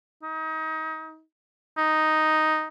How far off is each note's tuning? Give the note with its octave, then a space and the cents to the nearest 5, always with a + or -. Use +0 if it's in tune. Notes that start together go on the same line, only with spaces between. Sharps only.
D#4 +30
D#4 +0